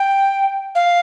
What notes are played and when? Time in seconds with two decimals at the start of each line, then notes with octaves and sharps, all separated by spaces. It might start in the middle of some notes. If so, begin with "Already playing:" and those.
Already playing: G5
0.75 F5